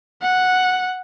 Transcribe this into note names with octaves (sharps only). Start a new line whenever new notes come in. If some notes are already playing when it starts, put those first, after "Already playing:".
F#5